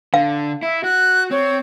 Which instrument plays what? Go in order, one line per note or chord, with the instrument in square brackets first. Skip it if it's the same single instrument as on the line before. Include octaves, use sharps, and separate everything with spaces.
[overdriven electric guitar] D3 [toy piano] F5
[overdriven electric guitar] E4 [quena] E5
[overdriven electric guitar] F#4 [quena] F#6
[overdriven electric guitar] C4 [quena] C#5